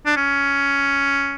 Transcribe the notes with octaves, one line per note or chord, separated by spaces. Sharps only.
D4
C#4